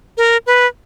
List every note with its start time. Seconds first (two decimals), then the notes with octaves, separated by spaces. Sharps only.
0.17 A#4
0.46 B4